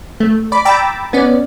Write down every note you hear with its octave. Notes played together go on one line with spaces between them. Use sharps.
A3
D5 B5 D6
G5 A#5 B5 D6 E6 A6
B3 C#4 D5